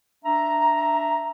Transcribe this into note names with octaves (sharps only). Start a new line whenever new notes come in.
D4 E5 A#5